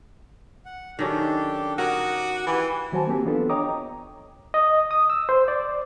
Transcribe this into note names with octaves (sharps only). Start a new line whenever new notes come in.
F#5
D#3 F#3 C#4 D4 G4 A4
F#4 A#4 C#5 D6 D#6 F#6
E3 G4 G#5
D#3 F#3 F#4 C5 G#5 A5
A#3 C4 G4
E3 B3 D4 F4 A4
C#5 D#5 G5 A#5 D6 D#6
D#5
D#6
E6
C5
D5